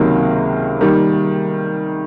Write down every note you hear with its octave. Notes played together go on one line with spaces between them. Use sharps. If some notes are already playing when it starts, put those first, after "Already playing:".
Already playing: C#2 C3 D#3 F#3 A#3
D#3 G3 A#3